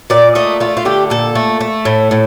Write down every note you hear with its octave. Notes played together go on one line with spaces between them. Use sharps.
A#2 D5
A3 D#5
A3 F4
F4
D3 G4
A#2 A4
A3
A3
A2
A2